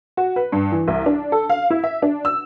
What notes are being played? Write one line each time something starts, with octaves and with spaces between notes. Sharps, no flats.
F#4
B4
G2
E3
C2
D4
A4
F5
E4
E5
D4
E6